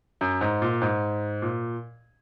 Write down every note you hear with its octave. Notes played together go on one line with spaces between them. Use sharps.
F#2
G#2
A#2
G#2
A#2